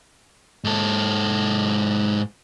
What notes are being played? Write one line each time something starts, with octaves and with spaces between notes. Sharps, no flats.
G#2 A4